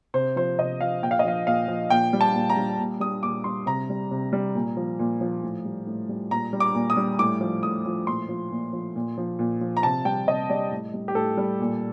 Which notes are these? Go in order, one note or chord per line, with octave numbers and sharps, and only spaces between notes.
C3 C5
F3 C5
C3 D#5
F3 F5
A#2 G5
F5
D#5
F3 F5
A#2 F5
F3
A#2 G5
G3
A5
A#2
A#5
G3
A#2
G3 D#6
A#2 D6
G3 C6
C3 A#5
G3
C3
G3
A#2
F3
A#2
F3
A2
G3
A2
G3
A#2 A#5
G3
D6
A#2
D#6
G3
A2 D6
F3
A2 D#6
F3
A#2 C6
F3
A#2
F3
A#2
F3
A#2
F3
A#5
C3 A5
G3 G5
C3 D#5
G3 D5
A2
G3
G4
A2 A4
G3
A#2